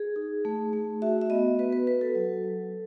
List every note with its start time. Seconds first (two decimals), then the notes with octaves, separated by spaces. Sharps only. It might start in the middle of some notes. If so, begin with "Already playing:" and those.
Already playing: G#4
0.16 D#4
0.45 A3
0.73 A3
1.02 F#4 E5
1.21 E5
1.30 B3 D#5
1.59 F#4 B4
1.73 B4
1.87 F#4 B4
2.01 A4
2.15 F#3
2.44 F#3